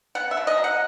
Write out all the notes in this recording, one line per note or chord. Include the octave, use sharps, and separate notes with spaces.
B3 F#5
E5
B2
D#5
F#3
F#5